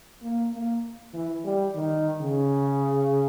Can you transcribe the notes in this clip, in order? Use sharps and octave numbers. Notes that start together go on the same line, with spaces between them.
A#3
A#3
E3
G3
D#3
C#3